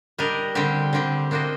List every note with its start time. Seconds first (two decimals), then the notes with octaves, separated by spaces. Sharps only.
0.18 G3 D4 G4 A#4 D#5
0.55 D3 G3 C4 G4
0.93 D3 G3 C4 G4
1.31 A#3 D4 F#4 C5 D#5